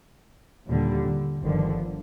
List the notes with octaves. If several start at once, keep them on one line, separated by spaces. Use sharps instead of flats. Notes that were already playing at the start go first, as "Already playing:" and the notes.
D#2 A#2 D3 G3
D3
G1 G2 D3 D#3 F3